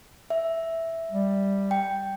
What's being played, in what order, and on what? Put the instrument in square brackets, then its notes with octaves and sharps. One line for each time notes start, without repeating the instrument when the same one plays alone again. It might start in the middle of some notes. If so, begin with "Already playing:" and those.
[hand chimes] E5
[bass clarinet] G3
[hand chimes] G5